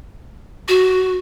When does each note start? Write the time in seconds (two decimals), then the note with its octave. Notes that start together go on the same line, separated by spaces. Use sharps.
0.68 F#4